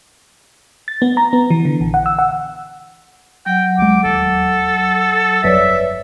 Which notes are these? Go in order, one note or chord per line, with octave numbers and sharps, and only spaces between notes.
A6
B3
A#5
B3
E3
D3
A#1
F#5
E6
F#5
F#3 F#5 G5
C#2 G#3 D6
E1 D#2 A4
G1 F2 F#3 B4 C#5 D5 E5